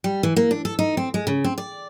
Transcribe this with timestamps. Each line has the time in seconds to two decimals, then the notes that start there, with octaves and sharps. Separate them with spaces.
0.04 G3
0.23 E3
0.36 A#3
0.51 D4
0.65 A4
0.79 D#4
0.97 C4
1.14 G#3
1.27 C#3
1.44 C4
1.58 D5